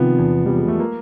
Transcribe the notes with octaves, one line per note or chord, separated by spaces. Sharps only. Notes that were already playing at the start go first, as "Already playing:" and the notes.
Already playing: C3 D#3 F3 B3
E2
E2 G3
G#3
A3
A#3